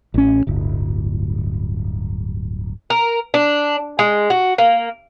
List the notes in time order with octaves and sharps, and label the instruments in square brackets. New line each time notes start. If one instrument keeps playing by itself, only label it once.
[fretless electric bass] A1 C#4
D1 G1
[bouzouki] A#4
D4
G#3
F#4
A#3